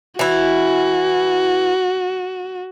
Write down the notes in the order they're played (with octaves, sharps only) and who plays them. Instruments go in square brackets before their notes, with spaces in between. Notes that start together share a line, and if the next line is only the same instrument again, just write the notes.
[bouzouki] E3 E4 [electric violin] F#4